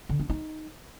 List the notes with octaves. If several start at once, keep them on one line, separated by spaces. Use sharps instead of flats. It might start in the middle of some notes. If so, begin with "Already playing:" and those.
D3
D4
D#4